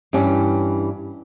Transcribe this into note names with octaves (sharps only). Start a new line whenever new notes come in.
G2 E3 G3 C#4